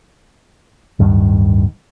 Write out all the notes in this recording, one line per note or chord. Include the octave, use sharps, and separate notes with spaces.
D1 G2 D#3